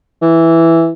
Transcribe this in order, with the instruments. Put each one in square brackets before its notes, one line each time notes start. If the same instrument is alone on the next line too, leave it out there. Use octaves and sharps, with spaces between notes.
[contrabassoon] E3